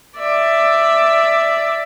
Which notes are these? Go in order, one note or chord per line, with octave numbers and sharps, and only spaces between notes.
D5 E5